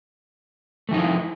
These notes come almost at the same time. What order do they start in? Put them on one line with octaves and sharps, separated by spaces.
A3 E3 D#4 F3 E4